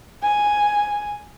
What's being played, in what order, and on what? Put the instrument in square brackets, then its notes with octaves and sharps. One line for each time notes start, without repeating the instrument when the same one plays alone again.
[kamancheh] G#5